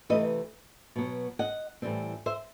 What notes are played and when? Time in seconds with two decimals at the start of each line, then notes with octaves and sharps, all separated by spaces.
0.09 C3 E3 A3 C4 B4 D#5
0.96 B2 F#3 B3
1.39 D#5 F#5
1.82 A2 E3 G3 C4
2.26 C5 E5